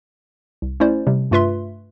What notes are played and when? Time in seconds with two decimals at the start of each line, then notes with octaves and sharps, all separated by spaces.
0.62 C2
0.80 A3 C#4 E4 C5 D5
1.07 C3 G3
1.31 G2 A3 F4 B4 E5 C6